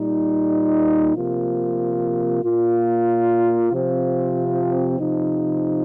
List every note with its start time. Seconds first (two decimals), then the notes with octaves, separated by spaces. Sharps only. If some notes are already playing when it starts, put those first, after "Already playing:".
Already playing: A#2 G3 D#4
1.16 C3 F3 A#3 F4
2.43 A#2 A#3 F4
3.71 C3 F3 C4 F4
4.99 C3 F3 D#4